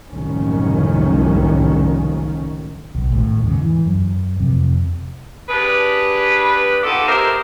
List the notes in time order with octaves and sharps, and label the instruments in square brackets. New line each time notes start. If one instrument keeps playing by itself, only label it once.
[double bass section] F#1 C2 A2 D#3 F3 C#4
[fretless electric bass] B1
G#1 A2
D#2 G#2 C#3
E3
F#2
F2 C3
[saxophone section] D4 G4 G#4 B4
B3 D#4 F4 G4 A4
D#4 G4 G#4 A#4 C5 E5